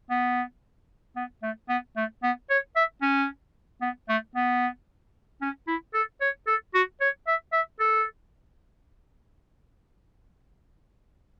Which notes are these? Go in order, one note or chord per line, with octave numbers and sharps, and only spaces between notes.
B3
B3
A3
B3
A3
B3
C#5
E5
C#4
B3
A3
B3
C#4
E4
A4
C#5
A4
F#4
C#5
E5
E5
A4